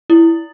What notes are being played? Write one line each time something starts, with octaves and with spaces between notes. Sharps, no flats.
E4